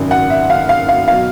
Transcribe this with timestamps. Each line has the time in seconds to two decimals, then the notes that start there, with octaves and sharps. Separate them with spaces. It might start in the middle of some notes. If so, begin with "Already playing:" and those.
Already playing: G#1 F#2 C#3
0.11 F#5
0.30 E5
0.50 F5
0.69 F5
0.89 F5
1.08 B2 F#3 F5